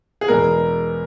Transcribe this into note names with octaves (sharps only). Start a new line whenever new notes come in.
G#4
E2 B2 G#3 B3 A#4